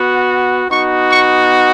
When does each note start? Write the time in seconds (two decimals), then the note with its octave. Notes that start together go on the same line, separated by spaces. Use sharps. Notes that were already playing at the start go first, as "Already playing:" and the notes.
Already playing: B3 F#4
0.70 B3 D#4 F#4 C#6
1.10 C#6